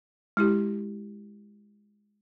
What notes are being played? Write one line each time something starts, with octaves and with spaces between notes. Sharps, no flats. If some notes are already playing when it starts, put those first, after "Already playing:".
G#3 E4 G4